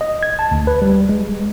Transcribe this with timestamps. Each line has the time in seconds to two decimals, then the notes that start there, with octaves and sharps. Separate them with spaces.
0.01 D#5
0.23 G#6
0.39 A5
0.51 D2
0.67 B4
0.82 G3
1.09 G#3